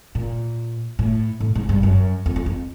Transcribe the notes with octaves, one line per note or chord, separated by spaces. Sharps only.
A#2
A2
A2
G#2
G2
F#2
F2
F2
F2